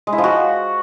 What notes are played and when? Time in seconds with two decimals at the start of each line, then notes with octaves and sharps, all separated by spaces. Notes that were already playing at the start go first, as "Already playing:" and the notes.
0.07 G#3
0.13 E4
0.18 F3
0.24 F#4